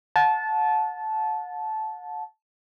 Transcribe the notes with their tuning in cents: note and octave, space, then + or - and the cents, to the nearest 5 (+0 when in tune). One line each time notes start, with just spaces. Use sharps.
F#5 -40 A5 -15